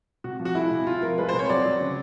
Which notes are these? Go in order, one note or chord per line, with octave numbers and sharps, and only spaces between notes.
C3 F#4
F3
F#4
G#3 E4
C3
C3 F4
F3 A#4
G#3 B4
C5
C3
C#5
F#3 D5
F#3
C#3